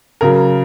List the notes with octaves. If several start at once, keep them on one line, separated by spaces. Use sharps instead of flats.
C#3 F#3 A#4